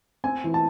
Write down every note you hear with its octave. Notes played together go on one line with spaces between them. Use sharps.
C4 G#5
E3
A5